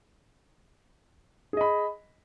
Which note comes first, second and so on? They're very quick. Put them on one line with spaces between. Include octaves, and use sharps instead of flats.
G#4 D#5 B5